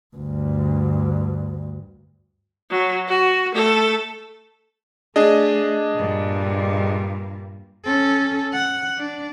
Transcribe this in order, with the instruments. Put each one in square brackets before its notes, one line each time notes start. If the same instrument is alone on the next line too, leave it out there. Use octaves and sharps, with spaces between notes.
[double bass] D2 G2
[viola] F#3
F#4
A3 A4
[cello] A3 [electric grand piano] D4 G#4 D#5
[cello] G2 A#2
C#4 A4
F#5
D4